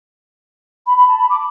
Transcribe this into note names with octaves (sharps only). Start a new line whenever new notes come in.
B5
B5
A5
B5
D6